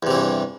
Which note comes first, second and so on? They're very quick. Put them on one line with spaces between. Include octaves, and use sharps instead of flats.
E2 C3 E3 G2